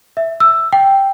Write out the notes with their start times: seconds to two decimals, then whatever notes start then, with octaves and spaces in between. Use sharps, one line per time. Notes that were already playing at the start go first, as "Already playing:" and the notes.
0.17 E5
0.40 E6
0.73 G5